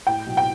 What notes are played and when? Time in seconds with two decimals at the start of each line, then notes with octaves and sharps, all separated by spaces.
0.07 A2 G5
0.26 B1
0.37 G5